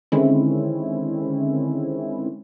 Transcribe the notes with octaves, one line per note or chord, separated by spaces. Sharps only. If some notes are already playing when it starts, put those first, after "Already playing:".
D3 D#3 G#3 C4 C#4 E4